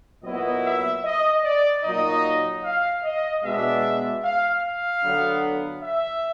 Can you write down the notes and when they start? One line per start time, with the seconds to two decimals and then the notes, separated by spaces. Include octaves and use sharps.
0.24 A#2 F#3 B3 E4 D#5
0.64 E5
1.04 D#5
1.43 D5
1.83 A#2 F#3 A#3 D#4 D#5
2.64 F5
3.03 D#5
3.43 B2 G#3 B3 D4 E5
4.23 F5
4.63 F5
5.04 D3 F#3 B3
5.83 E5